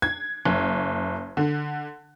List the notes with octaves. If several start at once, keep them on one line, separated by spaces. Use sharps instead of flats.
G#6
F#1
D3